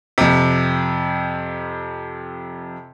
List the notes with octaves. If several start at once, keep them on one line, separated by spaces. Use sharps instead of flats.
F2 C3